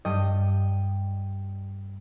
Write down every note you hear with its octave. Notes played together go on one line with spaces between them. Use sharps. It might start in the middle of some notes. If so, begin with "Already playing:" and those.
G2 G3 D#5 G5 D#7